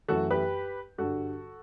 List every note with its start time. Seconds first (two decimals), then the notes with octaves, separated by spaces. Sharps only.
0.08 F#2 E3 A3 F#4 A4
0.31 G4 B4
0.98 G2 D3 G3 F#4 A4